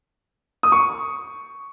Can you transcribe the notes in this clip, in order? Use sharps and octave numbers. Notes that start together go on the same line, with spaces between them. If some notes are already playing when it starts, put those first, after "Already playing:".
D#6
C#6